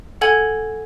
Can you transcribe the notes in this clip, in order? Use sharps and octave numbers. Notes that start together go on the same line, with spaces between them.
A4 F#5 G#5 G#6 F#7